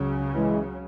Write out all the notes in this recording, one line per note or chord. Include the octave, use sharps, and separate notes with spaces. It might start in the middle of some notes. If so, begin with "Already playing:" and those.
Already playing: C#2 C#3 F#3 C#4
E3 G#3